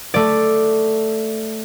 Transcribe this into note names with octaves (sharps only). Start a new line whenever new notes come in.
A3 D5